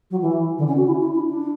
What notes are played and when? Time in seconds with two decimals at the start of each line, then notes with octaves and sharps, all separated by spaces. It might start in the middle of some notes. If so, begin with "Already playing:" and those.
0.10 F#3
0.21 E3
0.58 D3
0.67 C#4
0.77 F#4
0.87 E4
1.01 E4
1.15 D4
1.28 D4